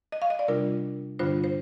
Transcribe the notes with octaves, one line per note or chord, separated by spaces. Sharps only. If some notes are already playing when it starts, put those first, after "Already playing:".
D#5
F5
D#5
D5
C3 G3 D4 F4 A#4
G2 D3 G3 D4 F4 C5
C5